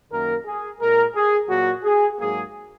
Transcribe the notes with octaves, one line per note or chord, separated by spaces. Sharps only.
F#2 D#3 A#3 A#4
G#4
A#2 G#3 A#4
G#4
A#2 F#3 A#3 F#4
G#4
G#2 F#3 A#3 G#4